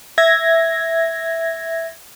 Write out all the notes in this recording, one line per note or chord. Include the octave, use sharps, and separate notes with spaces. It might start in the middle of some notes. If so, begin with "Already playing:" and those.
E5 G#6 A#6